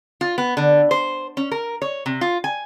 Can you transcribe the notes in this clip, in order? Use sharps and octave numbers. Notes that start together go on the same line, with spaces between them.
F4
B3
D3
C5
C#4
A#4
C#5
C3
F4
G#5